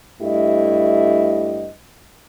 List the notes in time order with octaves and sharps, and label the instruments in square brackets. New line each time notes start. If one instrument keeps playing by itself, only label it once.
[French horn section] G2 A3 E4 G4 D#5